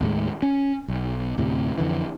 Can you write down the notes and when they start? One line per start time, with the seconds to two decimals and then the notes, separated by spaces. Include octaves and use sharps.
0.01 D#2 A2 G#3
0.42 C#4
0.88 B1
1.38 D2 A2 C3
1.78 F2 D3 E3